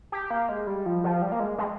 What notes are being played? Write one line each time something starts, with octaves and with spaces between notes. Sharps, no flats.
G4
A#3
G#3
G3
F3
F3
G3
A#3
G#3
G#3